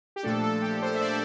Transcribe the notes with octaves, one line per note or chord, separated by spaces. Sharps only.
G4
A#2 F3 A3 D4 A4
A4
G4
C5
E5
D5